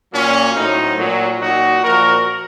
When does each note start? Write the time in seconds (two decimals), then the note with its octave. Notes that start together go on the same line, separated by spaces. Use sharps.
0.13 A#2 F#3 A#3 C#4
0.56 A2 F#3 C4 D#4
0.99 A#2 F#3
1.40 A#2 F#3 D#4 F#4
1.83 A#2 F3 F#4 A#4